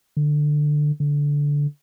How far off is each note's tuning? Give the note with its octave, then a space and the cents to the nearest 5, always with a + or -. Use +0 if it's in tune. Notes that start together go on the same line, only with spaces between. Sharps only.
D3 +15
D3 -15